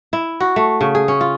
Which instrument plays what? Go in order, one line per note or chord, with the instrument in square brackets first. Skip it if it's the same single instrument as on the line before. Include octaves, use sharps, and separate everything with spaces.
[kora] E4
F#4
A3
C#3
G#4
C#4
F4